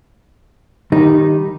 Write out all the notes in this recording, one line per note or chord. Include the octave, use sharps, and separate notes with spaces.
D#3 G3 D#4